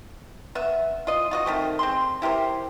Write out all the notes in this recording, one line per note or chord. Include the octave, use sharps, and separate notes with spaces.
B3 E5
F4 D#5
F4 F#4 D#5
D#3 A3 C4
C4 G#4 C6
E4 G4 A#4 C5